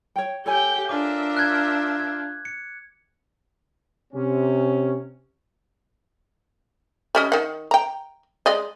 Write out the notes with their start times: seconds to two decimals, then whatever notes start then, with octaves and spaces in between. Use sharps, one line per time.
0.16 C#5 G5
0.46 G4 A4 C#5 G5 G#5
0.89 D4 F4 A#4 E5 D6
1.37 F#6 G#6
2.00 G#6
2.45 C#7
4.13 C3 C#4
7.15 G3 C#4 D#5
7.32 D#3 F#5
7.71 G5 A#5
8.46 G#3 D5 D#5